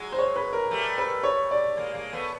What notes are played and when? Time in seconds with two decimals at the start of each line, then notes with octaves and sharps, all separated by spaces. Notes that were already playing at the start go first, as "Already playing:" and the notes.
Already playing: F#3 G#3
0.12 C5
0.19 C#5
0.36 B4
0.53 A#4
0.71 G3 A3
0.98 B4
1.23 C#5
1.51 D5
1.77 G#3 A#3
1.94 G#3 A#3
2.13 A3 B3